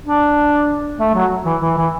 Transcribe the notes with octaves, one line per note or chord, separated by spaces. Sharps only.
D4
A3
F#3
E3
E3
E3